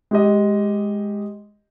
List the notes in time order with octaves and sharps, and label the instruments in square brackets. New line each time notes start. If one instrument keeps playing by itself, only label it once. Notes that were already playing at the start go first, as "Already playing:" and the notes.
[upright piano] G#3 G4 D#5